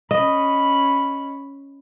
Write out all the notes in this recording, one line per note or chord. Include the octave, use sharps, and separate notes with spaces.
C#4 D#5 B5